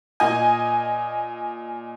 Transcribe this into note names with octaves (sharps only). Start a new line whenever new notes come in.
A#2 D#5 G#5